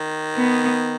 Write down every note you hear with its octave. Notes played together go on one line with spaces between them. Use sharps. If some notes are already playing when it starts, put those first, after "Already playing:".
Already playing: D#3
B3